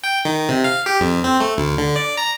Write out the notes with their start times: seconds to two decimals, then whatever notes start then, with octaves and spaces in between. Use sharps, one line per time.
0.04 G5
0.25 D#3
0.49 C3
0.64 F5
0.86 G4
1.00 F2
1.24 C4
1.40 A3
1.58 D2
1.78 D3
1.96 D5
2.17 A#5